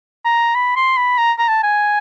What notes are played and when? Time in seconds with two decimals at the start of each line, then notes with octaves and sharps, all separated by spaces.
0.25 A#5
0.55 B5
0.76 C6
0.97 B5
1.18 A#5
1.39 A#5
1.49 A5
1.64 G#5